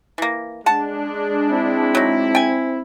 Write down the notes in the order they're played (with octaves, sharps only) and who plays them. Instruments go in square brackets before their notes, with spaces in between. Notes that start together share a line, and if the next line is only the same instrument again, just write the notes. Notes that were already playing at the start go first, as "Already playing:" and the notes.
[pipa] E3 A#3
[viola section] G#3 D4 [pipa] F#5 A5
[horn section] C4 E4
[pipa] F#3 D#4
G5 G#5